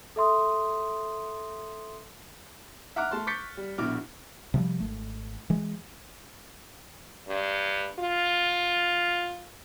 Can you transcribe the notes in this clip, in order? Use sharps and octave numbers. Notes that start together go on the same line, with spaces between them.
A4 E5 C6 D#6
E5 F#5 A#5 D6 F6 F#6
A3 A5 C6
C#6 D6 G6 A6 B6 C#7
G3
A#1 B2 E4 D6 F6
C3 F3 G3
G#1 A3
E3 G#3
G2
F4